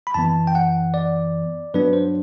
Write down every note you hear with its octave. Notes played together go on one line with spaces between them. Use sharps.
B5
F#2 E3 B3 A5
G5
F#5
D5
G2 F#3 B3 D4 B4
C5